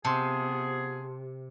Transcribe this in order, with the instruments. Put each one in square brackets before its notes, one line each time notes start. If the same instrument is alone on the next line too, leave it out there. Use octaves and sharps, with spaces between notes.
[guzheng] C3 [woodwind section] F3 B3 G#4 [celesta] A5 C6